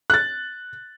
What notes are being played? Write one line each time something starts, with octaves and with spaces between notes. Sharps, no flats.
F#6 A6